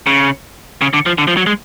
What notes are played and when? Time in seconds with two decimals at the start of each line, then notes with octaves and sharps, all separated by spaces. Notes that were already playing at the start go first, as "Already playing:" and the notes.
0.07 C#3
0.81 C#3
0.93 D3
1.06 F3
1.18 D3
1.28 F3
1.37 F#3
1.46 G#3